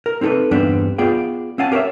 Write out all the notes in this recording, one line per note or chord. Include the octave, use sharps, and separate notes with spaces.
A#4
C4 D#4 G4 A4 B4
E2 G2 G3 B3 C4 D4
B3 F4 G#4 D5 G5
C4 C#4 F5 F#5 G#5 A5
G4 A#4 B4 C#5 E5